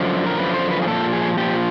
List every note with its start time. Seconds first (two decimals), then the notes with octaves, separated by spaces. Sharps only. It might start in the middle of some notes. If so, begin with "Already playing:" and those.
Already playing: F#2 D3 F3
0.26 A#4
0.37 F#2 D3 F3 B4
0.54 C5
0.71 B4
0.82 G#4
0.87 A#2 F3 A4
1.12 G#4
1.37 A#2 F3 G4